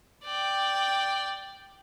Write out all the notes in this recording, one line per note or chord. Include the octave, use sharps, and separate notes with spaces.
D5 G5